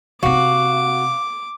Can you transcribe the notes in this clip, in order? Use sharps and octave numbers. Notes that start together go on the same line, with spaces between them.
C3 C4 F#4 F5 D6